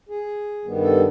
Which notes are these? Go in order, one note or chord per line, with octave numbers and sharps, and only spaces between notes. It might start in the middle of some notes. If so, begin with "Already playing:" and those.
G#4
G2 D#3 G3 B3
A4